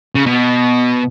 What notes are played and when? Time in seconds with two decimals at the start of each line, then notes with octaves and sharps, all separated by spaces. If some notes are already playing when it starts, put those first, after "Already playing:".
0.15 C#3
0.26 B2